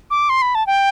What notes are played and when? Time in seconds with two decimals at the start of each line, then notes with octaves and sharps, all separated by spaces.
0.11 D6
0.29 C6
0.42 B5
0.55 A5
0.67 G5